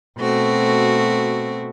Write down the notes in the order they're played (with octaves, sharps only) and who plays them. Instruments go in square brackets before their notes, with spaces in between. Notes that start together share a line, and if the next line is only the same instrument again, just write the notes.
[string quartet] B2 A3 C4 F#4